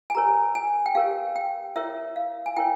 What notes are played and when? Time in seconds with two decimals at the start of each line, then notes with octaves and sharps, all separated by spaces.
0.10 G#5
0.15 G4 A#4 C#5 A#5
0.55 G#5
0.86 G5
0.95 G4 A#4 C#5 F5
1.36 G5
1.76 E4 A#4 C#5 E5
2.16 F5
2.46 G#5
2.56 E4 A#4 C#5 G5